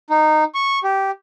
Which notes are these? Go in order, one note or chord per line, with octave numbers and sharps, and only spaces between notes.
D#4
C#6
G4